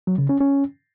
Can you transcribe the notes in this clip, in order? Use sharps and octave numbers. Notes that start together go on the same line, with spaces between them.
F#3
C#3
C#4
C#4